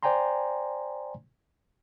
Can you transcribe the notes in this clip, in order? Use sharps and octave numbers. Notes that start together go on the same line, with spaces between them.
C5 D5 G5 G#5 A#5 C6